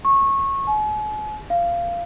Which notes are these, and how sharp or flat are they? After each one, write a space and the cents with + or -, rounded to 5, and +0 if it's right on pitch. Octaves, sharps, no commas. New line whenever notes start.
C#6 -20
G#5 +45
F5 -15